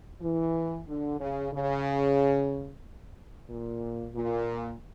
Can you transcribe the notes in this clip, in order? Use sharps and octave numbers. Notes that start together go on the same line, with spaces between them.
E3
D3
C#3
C#3
A#2
A#2